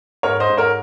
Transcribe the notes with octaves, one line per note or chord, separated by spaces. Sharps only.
G#2 A#4 C#5
C5 D#5
G#2
A#4 C#5